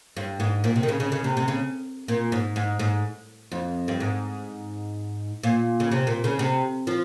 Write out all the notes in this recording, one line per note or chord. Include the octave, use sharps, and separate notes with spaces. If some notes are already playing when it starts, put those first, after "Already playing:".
G2
G#2
A#2
C3
D#3
C#3
C#3
C#3
C3
C3
C#3
A#2
G#2
G#2
G#2
F2
G2
G#2
A#2
C#3
C3
A#2
C#3
C3
F3